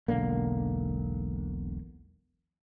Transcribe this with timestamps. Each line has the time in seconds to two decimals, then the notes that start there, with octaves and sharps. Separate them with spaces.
0.08 E1 B1 D3 A#3